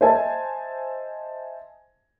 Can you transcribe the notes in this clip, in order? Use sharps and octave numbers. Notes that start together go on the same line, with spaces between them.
C5 D#5 E5 G#5 A5